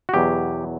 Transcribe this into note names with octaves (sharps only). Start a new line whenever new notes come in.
F#4
E2 B2 F#3 G4